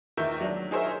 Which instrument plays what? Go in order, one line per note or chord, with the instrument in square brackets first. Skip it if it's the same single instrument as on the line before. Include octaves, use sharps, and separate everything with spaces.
[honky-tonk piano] E2 D#3 A#4 E5 C#6 G6
F#3 D4
D#4 G#4 A#4 C5 C#5 E5